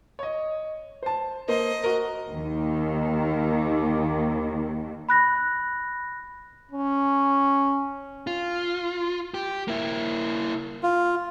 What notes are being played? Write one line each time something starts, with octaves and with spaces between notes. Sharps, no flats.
C#5 D#5
C5 A5
A#3 C5 D#5
F#4 A#4
D#2 D#3
B5 F#6 A#6
C#4
F4
G4
A#3 E4
F4